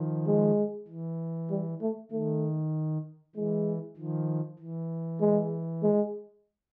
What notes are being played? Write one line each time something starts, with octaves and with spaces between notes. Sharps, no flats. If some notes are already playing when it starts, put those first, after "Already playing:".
Already playing: D#3 F3
G#3
E3
G3
A3
D#3 A3
E3 G#3
D#3 F3
E3
G#3
G#3